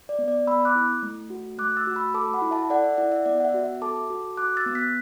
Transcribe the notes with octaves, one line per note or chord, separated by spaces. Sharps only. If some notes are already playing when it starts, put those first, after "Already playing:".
D5
B3
D5
B3 B5 E6
D6 F#6
E4
A3
F#4
A3 D6 F#6
E6 A6
F#4
B5 E6
A4 A5 D6
F#5 B5
E4
E5 A5
A4 D5 F#5
E5
E4 D5 F#5
E5
B3 D5
F#5
E5
F#4
E5
A4 A5 D6
F#4
F#4 D6 F#6
E6 A6
B3
F#6 B6